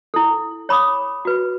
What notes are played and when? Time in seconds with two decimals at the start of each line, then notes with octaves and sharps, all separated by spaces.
0.14 E4 A4
0.69 C#5 B5 D6 D#6
1.25 F#4 B4